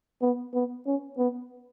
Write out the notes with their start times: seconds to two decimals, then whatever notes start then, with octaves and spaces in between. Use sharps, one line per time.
0.22 B3
0.54 B3
0.86 C#4
1.18 B3